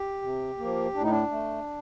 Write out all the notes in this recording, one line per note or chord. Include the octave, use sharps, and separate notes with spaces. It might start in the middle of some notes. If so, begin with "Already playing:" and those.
Already playing: G4
C3
F3 A#3
A2 D4
D#4
D4
A3